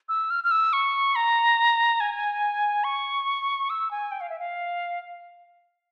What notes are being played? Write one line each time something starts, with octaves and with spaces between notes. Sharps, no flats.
E6
F6
F6
E6
C#6
A#5
G#5
C#6
E6
G#5
G5
F5
E5
F5